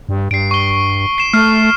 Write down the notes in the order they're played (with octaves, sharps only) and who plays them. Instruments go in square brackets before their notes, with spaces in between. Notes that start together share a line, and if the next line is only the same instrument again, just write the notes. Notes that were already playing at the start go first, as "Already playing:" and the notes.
[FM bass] G2
[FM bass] G2 [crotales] C7 D7
[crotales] C#6 G7
C7 E7
[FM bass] A3 [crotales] F6 C7